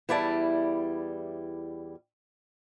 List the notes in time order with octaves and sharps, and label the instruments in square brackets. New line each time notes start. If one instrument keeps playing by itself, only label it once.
[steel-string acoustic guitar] E2 G3 E4 D5 E5 A5